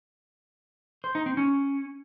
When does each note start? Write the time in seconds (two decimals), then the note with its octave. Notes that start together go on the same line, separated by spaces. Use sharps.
1.04 C5
1.15 D#4
1.26 C4
1.37 C#4